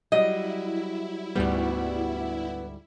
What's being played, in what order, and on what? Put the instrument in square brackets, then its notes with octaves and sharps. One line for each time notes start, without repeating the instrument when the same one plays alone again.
[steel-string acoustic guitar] F#3 G3 [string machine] E4 [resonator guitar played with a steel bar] D#5
[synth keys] D2 G#2 G3 [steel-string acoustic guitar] B3 F#4